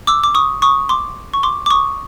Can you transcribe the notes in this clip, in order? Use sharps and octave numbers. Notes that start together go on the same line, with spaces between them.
D6 E6
D6
C#6 D#6
C#6 D#6
C6 D6
C#6
C6 D6
D6
C#6 D#6